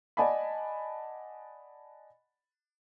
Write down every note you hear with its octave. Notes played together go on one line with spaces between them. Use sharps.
D5 D#5 F#5 G#5 A5 B5